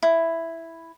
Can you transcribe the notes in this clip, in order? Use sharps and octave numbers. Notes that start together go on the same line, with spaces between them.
E4